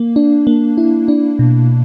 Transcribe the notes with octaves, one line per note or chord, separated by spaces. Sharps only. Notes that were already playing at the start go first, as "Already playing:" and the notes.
Already playing: A#3
D4
A#3
E4
D4
B2